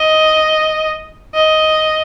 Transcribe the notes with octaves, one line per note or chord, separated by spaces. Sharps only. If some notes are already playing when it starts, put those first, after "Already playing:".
Already playing: D#5
D#5